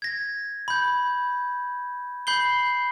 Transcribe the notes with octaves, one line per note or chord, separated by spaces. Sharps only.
G#6 A#6
B5 G6
B5 G6 C7 G7